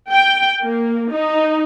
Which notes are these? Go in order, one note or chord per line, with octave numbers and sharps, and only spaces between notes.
G5
A#3
D#4